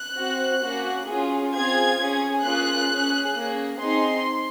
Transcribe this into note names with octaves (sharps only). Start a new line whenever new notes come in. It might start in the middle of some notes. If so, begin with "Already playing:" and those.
Already playing: F#6
C4 F#4
A#3 C#4 F#4
C#4 F4 G#4
C4 F4 G#4 G#6
C#4 G#4
A#3 C#4 F4 G#4 F#6
C#4 G#4
A#3 C#4 G#4
C4 D#4 G#4 C6